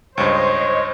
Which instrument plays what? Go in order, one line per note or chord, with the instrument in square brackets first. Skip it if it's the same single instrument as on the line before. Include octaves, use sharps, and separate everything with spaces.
[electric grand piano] C#2 G2 [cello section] C5 D#5 [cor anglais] C#5